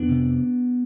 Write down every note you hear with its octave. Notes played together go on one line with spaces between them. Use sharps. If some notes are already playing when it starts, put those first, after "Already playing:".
Already playing: F2 B3 D4
C3